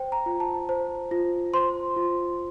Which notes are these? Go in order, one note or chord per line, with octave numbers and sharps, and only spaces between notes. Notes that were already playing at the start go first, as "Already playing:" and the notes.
Already playing: C5 G5
A#5
F4
A5
C5
F4
C5 C6
F4